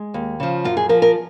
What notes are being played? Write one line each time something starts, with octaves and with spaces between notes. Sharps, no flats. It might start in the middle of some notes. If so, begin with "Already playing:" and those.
Already playing: G#3
D#2
C#3 F3
F#2 F4
G#4
F3 A#4
A#4